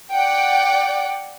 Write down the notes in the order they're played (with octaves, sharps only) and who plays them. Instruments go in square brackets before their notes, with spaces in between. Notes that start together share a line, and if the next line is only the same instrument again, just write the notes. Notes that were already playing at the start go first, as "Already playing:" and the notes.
[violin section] D5 F#5 G5